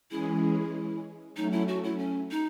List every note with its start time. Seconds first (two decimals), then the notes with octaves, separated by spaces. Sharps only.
0.10 E3 G#3 C#4 E4 G#4
1.36 F#3 A3 C#4 D#4
1.52 E4
1.68 F#4
1.84 E4
1.99 C#4
2.31 D#4